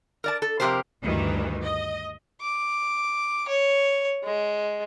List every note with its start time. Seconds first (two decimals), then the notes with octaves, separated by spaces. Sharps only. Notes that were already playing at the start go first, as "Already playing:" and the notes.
0.24 A#4 D5 A5
0.42 A4
0.60 F2 C3 D#3 G4 A#4 C5
1.03 D2 G2 D#3 E3
1.62 D#5
2.41 D6
3.48 C#5
4.23 G#3